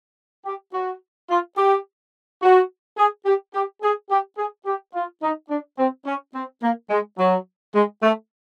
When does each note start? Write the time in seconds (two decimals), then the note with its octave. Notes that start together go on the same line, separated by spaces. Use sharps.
0.45 G4
0.74 F#4
1.30 F4
1.57 G4
2.42 F#4
2.98 G#4
3.26 G4
3.54 G4
3.82 G#4
4.10 G4
4.37 G#4
4.66 G4
4.94 F4
5.22 D#4
5.50 D4
5.78 C4
6.06 C#4
6.35 C4
6.62 A#3
6.90 G#3
7.18 F#3
7.74 G#3
8.02 A3